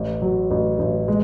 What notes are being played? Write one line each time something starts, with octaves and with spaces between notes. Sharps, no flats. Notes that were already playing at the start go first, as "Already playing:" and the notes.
Already playing: A1
F#3
A1
A1
G#3